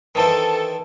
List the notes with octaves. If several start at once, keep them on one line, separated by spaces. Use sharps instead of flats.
D#3 E3 A4 C5